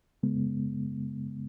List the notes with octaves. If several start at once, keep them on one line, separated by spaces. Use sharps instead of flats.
C#3 G#3 B3